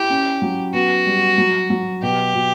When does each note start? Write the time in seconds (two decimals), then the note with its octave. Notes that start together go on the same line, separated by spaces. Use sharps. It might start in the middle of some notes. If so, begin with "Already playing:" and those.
Already playing: E4 G4
0.10 C#4
0.42 F#3
0.74 B3 F#4
1.06 G3
1.38 F#3
1.70 F#3
2.02 B2 G4
2.34 B2